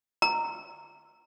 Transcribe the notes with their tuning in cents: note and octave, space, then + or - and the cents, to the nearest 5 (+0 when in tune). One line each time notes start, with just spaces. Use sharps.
A#5 -15